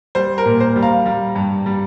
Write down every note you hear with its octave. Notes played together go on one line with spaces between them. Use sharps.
G3 C5
A#4
A#2
C5
G3
F5 A#5
G3
G2
G3